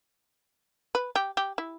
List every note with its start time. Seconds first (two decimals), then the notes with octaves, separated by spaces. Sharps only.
0.95 B4
1.16 G4
1.37 G4
1.58 E4